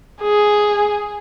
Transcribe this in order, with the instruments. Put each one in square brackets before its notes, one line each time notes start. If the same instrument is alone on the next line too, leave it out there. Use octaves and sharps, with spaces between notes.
[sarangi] G#4